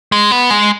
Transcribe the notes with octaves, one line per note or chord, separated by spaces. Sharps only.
G#3
B3
G#3